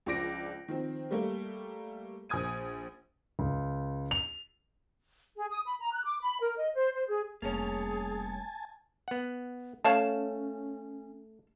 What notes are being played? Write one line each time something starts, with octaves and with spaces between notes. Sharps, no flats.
C#2 F3 D4 D6 A#6 D7
D#3 F3 C4
G3 A3 A#3
A#1 G#5 D#6 G#6 D#7
C#2
F7
G#4
D#6
B5
A#5
F#6
D6
B5
A#4
D#5
C5
C5
G#4
F1 G3 A#3 C#4 G#4 C#5 G#5 A5
B3 F#5
A3 C#4 C#5 F5 A5